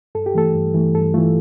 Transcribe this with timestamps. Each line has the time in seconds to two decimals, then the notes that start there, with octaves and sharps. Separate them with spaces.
0.15 G2 A4
0.26 G4
0.35 E3 A3 A4
0.54 G2
0.74 E3 A3
0.94 G2 A4
1.14 E3 A3 F4